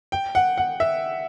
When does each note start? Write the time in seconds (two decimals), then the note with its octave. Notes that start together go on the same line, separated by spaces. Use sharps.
0.12 G5
0.35 F#5
0.58 F#5
0.80 E5